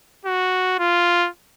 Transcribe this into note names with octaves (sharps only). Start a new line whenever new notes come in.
F#4
F4